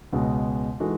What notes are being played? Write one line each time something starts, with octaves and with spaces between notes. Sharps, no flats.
C#2 B2 G#3
E3 G#3 D#4 F#4 A4